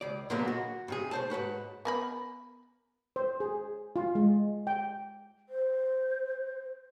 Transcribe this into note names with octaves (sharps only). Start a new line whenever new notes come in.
C#2 D5
A#2 D3 F#3 G#3 A#3 B3
F#4
G2 C3 G#4
A3 C5 A5
G#2 F#4 B4 C#5
B3 A#4 B5
C5
G#4
F4
G#3
G5
C5